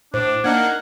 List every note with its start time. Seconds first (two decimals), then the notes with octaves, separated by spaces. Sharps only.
0.14 A2 D4 C5
0.44 A#3 D4 D#4 F#5 F6 G#6